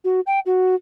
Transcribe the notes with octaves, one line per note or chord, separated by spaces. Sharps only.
F#4
G5
F#4